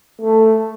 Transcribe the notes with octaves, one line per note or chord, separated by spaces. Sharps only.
A3